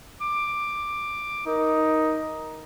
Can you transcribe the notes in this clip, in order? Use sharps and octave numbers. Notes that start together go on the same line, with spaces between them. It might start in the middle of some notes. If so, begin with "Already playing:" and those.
D6
D#4 A#4